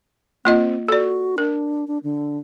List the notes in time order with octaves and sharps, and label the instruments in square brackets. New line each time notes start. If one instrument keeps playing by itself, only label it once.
[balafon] A#3 F4 D#5 [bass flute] C4
[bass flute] F#4 [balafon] A4 D5
[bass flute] D4 [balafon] A#4
[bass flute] D4
D3